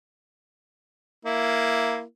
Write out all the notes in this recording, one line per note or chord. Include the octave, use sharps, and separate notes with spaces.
A#3 E4